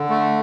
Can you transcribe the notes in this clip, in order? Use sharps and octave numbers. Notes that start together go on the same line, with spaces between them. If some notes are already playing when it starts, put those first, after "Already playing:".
Already playing: D3
A3